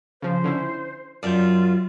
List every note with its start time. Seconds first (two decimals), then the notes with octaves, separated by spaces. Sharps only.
0.22 C#3 F3 C5
0.44 D3 C#4 E4
1.23 F#2 F4 D5 G6